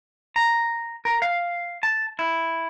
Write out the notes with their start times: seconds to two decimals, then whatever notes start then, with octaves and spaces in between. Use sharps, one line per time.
0.36 A#5
1.05 A#4
1.22 F5
1.83 A5
2.19 E4